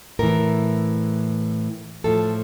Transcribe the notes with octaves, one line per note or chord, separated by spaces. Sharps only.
A2 E3 A#4
A2 F3 A4